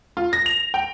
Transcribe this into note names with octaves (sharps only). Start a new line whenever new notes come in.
F4
A#6
F7
G5